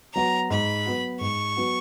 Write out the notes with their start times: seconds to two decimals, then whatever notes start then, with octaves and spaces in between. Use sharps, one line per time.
0.15 F#3 B3 F#4 A#5
0.50 G#2 B5
0.86 F#3 B3 F#4
1.21 G#2 C#6
1.57 F#3 B3 F#4